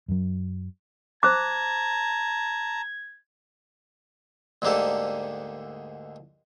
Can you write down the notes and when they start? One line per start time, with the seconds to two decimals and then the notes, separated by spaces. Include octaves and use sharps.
0.08 F#2 F#3
1.23 C5 A5 A#5 D6 G#6
4.62 D2 G#2 D3 A#3 G4 A4